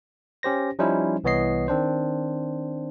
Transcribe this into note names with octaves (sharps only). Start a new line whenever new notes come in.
C#4 G4 C5 A#6
F3 G3 C#4 D#4 E4 C5
C2 E3 B3 C#5 D#5 C7
D#3 C4 D4 C5